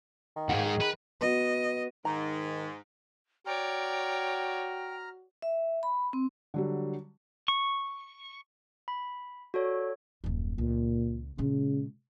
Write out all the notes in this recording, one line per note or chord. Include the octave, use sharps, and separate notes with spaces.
D#3
D#2 G#2 G#4 F5 F#5
G#4
B4
B3 F#4 D#5
G#2 D#3 A#5
F#4 C#5 D5 G5 A#5 F6
E5
B5
C4
D3 F#3 G3
C#6
B5
F#4 A4 C#5 D5
D#1 F#2
C#2 A#2
A#2 C#3 G#3